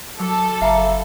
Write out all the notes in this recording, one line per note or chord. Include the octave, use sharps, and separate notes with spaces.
F#3 A4 D6 E6
F#1 E5 F5 A#5 B5 D6